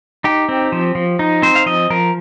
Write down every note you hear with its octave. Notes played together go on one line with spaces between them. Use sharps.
D#4 G4
C4
F3
F3
D#4
C4 C5
F5
F3 D#5
F3 A#4